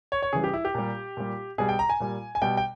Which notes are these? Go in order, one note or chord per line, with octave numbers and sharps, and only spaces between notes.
C#5
C#5
C#3 E3 G3 G#4
G4
E4
G4
A#2 G3
A#2 G3
B2 G3 G#4
G5
A#5
G#5
A#2 G3
G#5
B2 G3 G5
G5